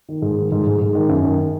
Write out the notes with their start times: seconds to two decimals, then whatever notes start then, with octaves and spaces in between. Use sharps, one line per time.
0.09 D#3
0.22 G#2
0.38 D#3
0.52 G#2
0.67 G#2
0.81 G#2
0.95 D#3
1.09 F#2
1.25 D#3